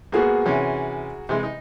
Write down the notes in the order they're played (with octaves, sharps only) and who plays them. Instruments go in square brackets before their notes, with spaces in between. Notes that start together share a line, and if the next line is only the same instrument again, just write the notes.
[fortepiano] G#2 A#3 B3 [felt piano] F#4 G#4 A#4
[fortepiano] C3 E3 C#4
C3 E3 G#3
D#4